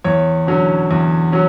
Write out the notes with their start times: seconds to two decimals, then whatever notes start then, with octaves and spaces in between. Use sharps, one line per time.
0.04 E2 C#5
0.47 D3 F#3 C#4
0.91 E2
1.32 F#3 C#4